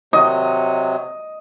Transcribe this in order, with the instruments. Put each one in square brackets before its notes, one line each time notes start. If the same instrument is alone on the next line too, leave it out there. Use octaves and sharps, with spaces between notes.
[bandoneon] C3 F#3 [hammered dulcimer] D#5